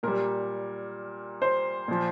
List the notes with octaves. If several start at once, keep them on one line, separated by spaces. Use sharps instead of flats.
A#2 G3 A#4
C5
A#2 F3